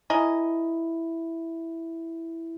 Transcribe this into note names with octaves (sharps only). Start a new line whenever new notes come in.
E4 G#4 A#4 D#5